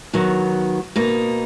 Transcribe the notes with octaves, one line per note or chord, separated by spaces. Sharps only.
D#3 F#3 B3
B2 A#3 D#4